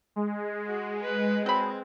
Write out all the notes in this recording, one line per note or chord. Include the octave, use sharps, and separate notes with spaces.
G#3
F#4
B4
F#3 C4 B5